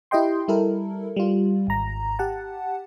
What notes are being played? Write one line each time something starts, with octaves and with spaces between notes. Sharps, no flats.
E4 G4 D#5 G5 C6
G3 E4 A4 A#4
G3 F4
G#1 A#5
G4 F#5 A5